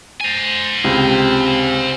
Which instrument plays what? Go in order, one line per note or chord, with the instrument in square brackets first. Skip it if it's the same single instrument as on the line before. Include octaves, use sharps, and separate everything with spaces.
[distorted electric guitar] C5 G#5
[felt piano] C#2 C3 C4